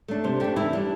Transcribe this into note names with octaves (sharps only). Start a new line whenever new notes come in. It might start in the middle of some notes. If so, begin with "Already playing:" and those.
A3 D4
C3 C5
A3 D4 G4
E3 E4
G3 D4